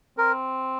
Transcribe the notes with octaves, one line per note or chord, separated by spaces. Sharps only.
C4 A#4